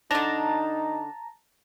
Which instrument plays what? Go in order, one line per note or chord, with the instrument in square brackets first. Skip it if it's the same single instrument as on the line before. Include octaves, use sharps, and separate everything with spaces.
[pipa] D3 D4 [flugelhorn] D#4 [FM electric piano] A5 A#5